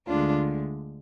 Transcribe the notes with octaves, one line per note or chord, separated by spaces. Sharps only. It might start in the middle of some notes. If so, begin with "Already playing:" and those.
D2 D3 G#3 D4 F4